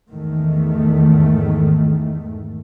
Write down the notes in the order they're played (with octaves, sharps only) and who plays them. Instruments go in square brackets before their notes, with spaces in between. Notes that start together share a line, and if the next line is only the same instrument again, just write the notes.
[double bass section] E2 G#2 D#3 A3